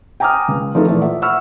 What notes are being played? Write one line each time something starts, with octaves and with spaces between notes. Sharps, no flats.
G5 G#5 A#5 D6 D#6 F6
C#2
F3 A3 D#4 E4 A4
A#2 E3 A3
F4 E5
E5 F#5 B5 C#6 E6 F6